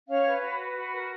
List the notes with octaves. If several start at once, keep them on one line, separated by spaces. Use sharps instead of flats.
C#4 C#5 F5
B4
F#4
B4
F#4
A#4